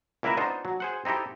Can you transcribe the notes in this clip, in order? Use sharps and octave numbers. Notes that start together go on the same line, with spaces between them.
C#2 A#3 E4 A#4 B4 E5
B3 D4 D#4 F4 C5
F#3
G#4 C5 F#5
C4 D#4 E4 G4 A4